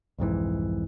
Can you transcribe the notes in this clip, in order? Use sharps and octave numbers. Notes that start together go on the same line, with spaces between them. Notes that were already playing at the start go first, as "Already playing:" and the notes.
C2 F2 G#2 E3